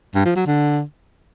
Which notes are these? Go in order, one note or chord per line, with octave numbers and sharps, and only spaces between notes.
G2
F3
F#3
D3